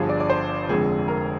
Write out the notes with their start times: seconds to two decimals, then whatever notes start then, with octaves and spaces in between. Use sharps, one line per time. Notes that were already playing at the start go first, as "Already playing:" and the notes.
Already playing: G1 G2 D3 F3 G#4
0.09 D5
0.20 D5
0.30 C5
0.69 F1 F2 D3 G#3 C4 G#4
1.08 A#4